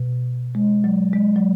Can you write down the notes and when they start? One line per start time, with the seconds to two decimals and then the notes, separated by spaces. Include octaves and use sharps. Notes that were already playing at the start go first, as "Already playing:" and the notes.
Already playing: B2
0.55 G#3
0.84 F#3
1.13 G#3
1.36 F#3